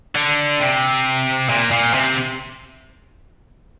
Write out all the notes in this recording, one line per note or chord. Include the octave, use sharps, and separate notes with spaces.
D3
C3
A#2
A#2
C3